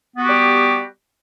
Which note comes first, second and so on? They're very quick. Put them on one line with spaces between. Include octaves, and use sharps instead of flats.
B3 F#4 G4 G3